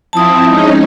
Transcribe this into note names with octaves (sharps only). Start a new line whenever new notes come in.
F3 C4 E4 A5 D#6
G#3 C#4 D#4